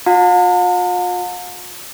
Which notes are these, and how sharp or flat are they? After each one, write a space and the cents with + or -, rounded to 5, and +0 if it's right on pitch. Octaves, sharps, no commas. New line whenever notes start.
F4 +40 F5 +45 A5 +45